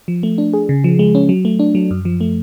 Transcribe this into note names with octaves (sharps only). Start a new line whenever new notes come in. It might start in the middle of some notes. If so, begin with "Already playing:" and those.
F3
A3
D4
G#4
C#3
F3
G#3
C#4
F#3
A3
D4
F#3
F#2
F3
A3